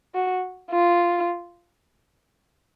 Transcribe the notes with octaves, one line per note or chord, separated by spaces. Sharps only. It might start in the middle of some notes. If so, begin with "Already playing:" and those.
F#4
F4